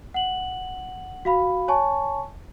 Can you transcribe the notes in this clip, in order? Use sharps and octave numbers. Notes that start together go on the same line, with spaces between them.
F#5 F#7
F#4 F5 B5
C#5 G#5 A5 C#6